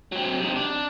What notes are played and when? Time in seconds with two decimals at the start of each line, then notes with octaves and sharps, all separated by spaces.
0.12 F#3 C4
0.40 C3 D#4
0.56 D4